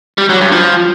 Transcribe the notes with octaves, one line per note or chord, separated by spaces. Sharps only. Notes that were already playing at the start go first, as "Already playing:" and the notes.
G3
F#3
G2
F3